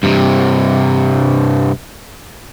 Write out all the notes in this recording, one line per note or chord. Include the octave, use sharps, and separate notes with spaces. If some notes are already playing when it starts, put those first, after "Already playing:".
G2 C3